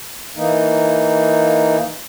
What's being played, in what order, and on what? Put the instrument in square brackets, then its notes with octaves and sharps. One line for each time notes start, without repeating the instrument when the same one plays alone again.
[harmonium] E3 A#3 D#4